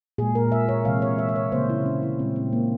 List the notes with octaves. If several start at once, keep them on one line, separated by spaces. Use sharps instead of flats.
A#2 G#3 G#4
A#4
E5
C#5
C3 E3 G#3 F5
C#5
E5
E5
C#5
C#3 G3 A#3 C5
E4
C#4
E4
A#2 G#3 C4
C4
A#3